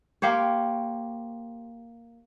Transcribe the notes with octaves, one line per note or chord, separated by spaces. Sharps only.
A#3 G4 C5 C#5